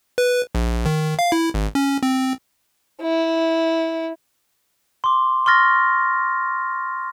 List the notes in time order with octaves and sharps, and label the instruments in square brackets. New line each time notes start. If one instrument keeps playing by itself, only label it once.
[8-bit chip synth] B4
A#1
D#3
F5
E4
G#1
C#4
C4
[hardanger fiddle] E4
[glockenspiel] C6 D6
C6 C#6 F6 A6 A#6